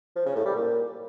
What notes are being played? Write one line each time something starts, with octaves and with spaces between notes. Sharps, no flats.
F3
C#3
A2
G3
A#2